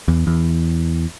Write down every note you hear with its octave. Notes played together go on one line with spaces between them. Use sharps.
E2
E2